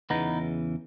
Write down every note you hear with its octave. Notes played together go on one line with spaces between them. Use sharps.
E2 C#3 E3 B3 D#4